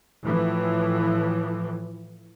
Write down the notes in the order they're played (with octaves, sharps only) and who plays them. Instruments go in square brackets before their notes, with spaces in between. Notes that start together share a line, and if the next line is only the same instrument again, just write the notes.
[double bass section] A2 E3 F3